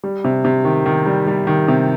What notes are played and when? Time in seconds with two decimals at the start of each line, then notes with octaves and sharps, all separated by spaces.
0.04 G3
0.24 C3
0.45 C3
0.65 D#3
0.86 D#3
1.06 G3
1.27 G3
1.47 D#3
1.68 C3